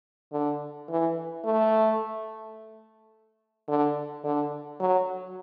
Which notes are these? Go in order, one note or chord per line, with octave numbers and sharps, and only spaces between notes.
D3
E3
A3
D3
D3
F#3